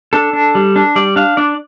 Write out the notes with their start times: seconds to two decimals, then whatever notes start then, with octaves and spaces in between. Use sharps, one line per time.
0.13 D4 A4
0.33 D4
0.55 G3
0.76 D4
0.96 G3 D5
1.16 D4 F5
1.37 D4 D5